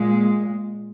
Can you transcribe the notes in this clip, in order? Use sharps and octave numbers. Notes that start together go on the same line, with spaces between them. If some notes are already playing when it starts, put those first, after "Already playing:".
Already playing: A#2 G#3